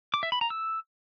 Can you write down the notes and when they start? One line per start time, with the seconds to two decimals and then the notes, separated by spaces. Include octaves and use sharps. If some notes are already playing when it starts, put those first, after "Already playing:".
0.14 D6
0.23 E5
0.32 B5
0.41 A#5
0.50 E6